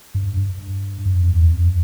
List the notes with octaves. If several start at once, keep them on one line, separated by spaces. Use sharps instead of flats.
G2
G2
F#2
F2
E2
F2